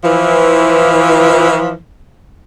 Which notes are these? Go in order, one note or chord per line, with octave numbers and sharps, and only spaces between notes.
E3 F3